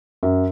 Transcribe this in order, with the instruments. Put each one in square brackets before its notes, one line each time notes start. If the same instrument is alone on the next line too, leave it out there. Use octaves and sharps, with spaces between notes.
[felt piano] F#2